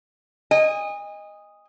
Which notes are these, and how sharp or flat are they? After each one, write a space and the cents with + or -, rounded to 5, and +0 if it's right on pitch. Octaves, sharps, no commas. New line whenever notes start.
D#5 +0 G#5 -35